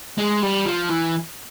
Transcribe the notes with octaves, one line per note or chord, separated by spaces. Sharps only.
G#3
G3
F3
E3